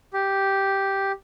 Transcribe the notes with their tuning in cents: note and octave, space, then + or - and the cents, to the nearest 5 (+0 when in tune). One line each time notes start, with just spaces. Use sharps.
G4 -5